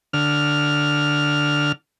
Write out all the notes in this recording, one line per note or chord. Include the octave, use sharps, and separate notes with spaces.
D3 F6